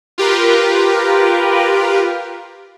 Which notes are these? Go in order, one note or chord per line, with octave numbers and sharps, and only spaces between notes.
F4 G4 A#4 B4